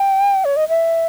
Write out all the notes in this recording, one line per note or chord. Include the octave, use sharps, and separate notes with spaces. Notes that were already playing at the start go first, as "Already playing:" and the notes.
Already playing: G5
C#5
D#5
E5